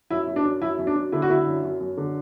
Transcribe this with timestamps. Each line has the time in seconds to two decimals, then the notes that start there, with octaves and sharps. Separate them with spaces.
0.10 F#2 E4
0.27 F#2
0.36 D4
0.45 F#2
0.62 F#2 E4
0.79 F#2
0.87 D4
0.96 F#2
1.12 D3 E4
1.22 F#4
1.30 D3 E4
1.47 F#2
1.63 F#2
1.81 F#2
1.97 D3